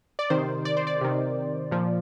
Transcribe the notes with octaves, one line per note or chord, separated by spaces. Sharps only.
D5
C3 D#3 C5
D5
C5
D5
C3 D#3
A#2 F3